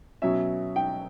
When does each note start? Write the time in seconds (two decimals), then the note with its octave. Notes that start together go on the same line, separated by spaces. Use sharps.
0.22 B2 F#3 C#4 E5
0.76 G5